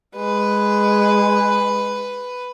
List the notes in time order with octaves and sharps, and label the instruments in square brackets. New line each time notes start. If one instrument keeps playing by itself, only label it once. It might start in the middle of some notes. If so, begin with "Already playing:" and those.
[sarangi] G#3 [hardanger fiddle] B4